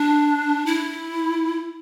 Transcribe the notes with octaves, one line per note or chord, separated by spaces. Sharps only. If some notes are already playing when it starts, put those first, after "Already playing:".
Already playing: D4
E4